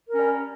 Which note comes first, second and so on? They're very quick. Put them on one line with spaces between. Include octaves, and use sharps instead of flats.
A#4 C#4 G3